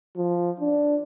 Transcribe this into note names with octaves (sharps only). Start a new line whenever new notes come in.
F3
D4